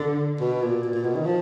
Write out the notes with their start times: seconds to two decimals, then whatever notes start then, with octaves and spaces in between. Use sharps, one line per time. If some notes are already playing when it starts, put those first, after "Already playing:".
Already playing: D3
0.41 B2
0.62 A#2
0.83 A#2
0.94 A#2
1.04 B2
1.15 D#3
1.26 F3